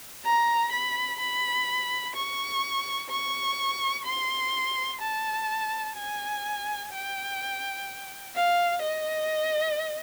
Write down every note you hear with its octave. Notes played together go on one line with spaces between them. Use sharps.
A#5
B5
B5
C#6
C#6
C6
A5
G#5
G5
F5
D#5